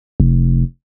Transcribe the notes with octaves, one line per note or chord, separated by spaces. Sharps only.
F1